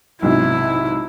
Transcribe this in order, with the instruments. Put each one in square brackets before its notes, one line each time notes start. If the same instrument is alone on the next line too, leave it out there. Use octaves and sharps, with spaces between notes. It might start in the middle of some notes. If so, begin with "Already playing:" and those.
[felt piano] B1 G#2 C3 [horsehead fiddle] E4